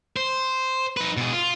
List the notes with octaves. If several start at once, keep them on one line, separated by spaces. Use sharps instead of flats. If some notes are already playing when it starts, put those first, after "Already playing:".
C5
D#4 B4
B2 G#4
F4